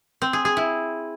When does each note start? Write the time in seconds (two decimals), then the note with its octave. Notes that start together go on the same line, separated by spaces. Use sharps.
0.22 C4
0.33 G#4
0.45 G#4
0.57 E4